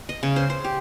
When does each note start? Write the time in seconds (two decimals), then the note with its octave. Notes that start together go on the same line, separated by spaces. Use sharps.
0.09 D#5
0.23 C#3
0.36 C5
0.50 C5
0.64 G4